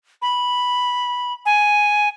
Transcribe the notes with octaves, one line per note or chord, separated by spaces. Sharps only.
B5
G#5